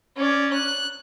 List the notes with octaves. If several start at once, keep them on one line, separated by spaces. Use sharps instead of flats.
C#4 D5
F#6